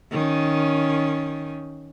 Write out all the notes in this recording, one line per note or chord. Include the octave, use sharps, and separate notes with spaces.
D#3 C#4